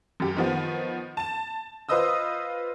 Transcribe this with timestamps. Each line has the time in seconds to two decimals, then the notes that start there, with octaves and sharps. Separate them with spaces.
0.20 F#2 G4
0.36 D#3 F3 B3
1.17 A5 E7
1.89 F4 B4 C5 D#5 D#6 E6